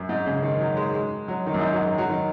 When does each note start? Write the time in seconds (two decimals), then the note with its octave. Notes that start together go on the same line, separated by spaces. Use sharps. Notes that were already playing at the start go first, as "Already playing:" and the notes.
Already playing: F#2
0.09 G#2
0.26 C#3
0.42 D#3
0.61 F#3
0.77 G#3
0.95 G#3
1.28 F#3
1.46 D#3
1.54 F#2
1.59 G#2
1.72 F#3
1.84 G#3
1.98 F#3
2.10 D#3